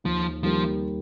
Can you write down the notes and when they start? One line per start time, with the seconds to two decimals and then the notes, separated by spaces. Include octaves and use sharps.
0.04 D#2 F3
0.43 D#3 F3 G3 A#3